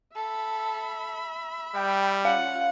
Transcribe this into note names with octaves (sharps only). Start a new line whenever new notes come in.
A4 E5 B5
G3 G5
C#4 F4 F5 F#5